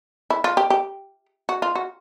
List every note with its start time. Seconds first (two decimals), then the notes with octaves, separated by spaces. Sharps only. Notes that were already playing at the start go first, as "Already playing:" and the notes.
0.30 E4
0.44 F4
0.57 G4
0.70 G4
1.49 F#4
1.62 F4
1.75 F#4